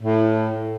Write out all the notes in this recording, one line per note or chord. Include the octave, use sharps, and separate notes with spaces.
A2